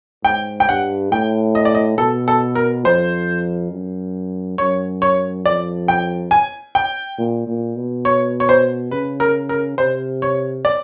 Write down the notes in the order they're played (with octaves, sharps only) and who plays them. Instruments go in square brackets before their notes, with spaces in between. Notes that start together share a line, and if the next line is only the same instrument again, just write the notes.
[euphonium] G#2 [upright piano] G5
[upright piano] G5
[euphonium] G2 [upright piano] F#5
[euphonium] A2 [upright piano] G5
[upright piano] D#5
D5
D#5
[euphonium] B2 [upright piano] A4
[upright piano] A4
A#4
[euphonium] F2 [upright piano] C5
[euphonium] F#2
[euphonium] F#2 [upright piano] C#5
[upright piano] C#5
[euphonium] F2 [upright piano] D5
[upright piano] G5
G#5
G5
[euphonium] A#2
A#2
B2
[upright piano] C#5
C#5
C5
[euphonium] C#3 [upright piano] B4
[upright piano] A#4
A#4
[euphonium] C3 [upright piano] C5
[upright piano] C#5
D5